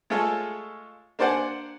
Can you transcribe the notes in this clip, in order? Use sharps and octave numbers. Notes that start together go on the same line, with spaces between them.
G#3 A3 F4 G#4 A4 C#5
A#3 D4 C5 D5 F#5 G#5